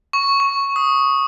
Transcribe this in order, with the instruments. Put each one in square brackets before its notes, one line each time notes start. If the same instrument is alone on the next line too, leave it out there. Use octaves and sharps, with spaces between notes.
[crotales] C#6
C#6
D#6